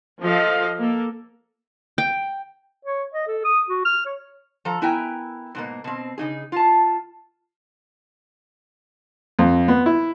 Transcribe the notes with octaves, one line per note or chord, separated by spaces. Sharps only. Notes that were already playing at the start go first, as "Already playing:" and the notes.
F3 A4 D#5 F5
A#3 A4
G5
C#5
D#5
A4
D#6
F#4
F6
C#5
F3 A4 A#5
B3 E4 A#4 G5 G#5 A#5
G#2 B2 A#3
B2 C4
C#3 D#4 G#4
F4 A5
F2
B3
E4